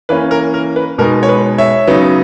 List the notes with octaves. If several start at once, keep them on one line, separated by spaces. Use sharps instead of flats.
E3 A#3 C#4 B4
A#4
A#4
B4
B2 G#3 B3 D#4 A#4
C#5
B4
C#5 E5
C#3 F#3 B3 D#4